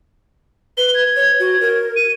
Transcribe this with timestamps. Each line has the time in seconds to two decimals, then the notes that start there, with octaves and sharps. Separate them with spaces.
0.78 B4 G7
0.95 G#6
1.16 C#5
1.40 F#4
1.61 A#4
1.96 D#7